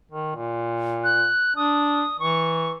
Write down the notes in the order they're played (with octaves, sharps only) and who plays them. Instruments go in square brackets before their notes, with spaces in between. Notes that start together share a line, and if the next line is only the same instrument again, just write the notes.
[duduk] D#3
A#2
[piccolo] F#6
[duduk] D4 [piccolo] D#6
[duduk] E3 [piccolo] C#6